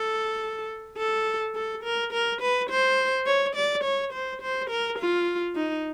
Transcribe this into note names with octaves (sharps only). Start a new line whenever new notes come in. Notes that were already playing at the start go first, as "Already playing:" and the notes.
Already playing: A4
A4
A4
A#4
A#4
B4
C5
C#5
D5
C#5
C5
C5
A#4
F4
D#4